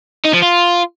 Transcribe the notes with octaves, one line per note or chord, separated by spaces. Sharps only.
D#4
F3
F4